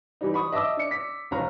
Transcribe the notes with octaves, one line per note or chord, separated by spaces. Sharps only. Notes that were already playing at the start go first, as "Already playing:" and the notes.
E3 G3 D#4
B5 C#6 D#6
D#5 E5 A5 D6 E6
D4 C#7
B6
F1 C#2 A#5 C#6 F6